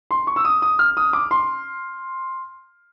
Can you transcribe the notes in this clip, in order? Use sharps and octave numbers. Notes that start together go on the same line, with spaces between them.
C6
C#6
E6
D#6
D#6
F6
D#6
D6
C6